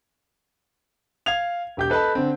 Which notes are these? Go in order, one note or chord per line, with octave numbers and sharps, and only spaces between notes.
F5 G#6 F7
E1 G4 G6
A4 B4 D#5 A5 B5
D3 C4